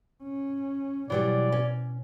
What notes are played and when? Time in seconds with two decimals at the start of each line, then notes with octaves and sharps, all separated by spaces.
0.23 C#4
1.10 B2 E3 F#3 G3 D5
1.52 C#4